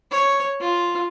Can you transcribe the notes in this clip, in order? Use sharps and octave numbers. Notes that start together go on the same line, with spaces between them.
C#5
F4